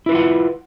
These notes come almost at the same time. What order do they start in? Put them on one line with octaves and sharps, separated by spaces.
E4 B4 F4 F#5